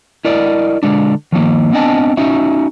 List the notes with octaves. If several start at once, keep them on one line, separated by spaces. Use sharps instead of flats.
E4 A#4 D5 D#5
D3 G#3 D4
D#3 F3 G#3 A#3
B3 C4 D4 D#5 G#5 A5
C#4 D#4 F#4 E5